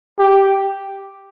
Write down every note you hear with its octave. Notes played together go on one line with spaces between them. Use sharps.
G4